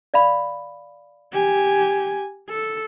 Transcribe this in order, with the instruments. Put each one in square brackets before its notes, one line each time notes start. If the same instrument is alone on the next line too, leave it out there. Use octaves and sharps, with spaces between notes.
[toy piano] D5 F5 B5
[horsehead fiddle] G4 G#5
A4